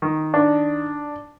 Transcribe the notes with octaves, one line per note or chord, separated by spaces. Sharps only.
D#3
D4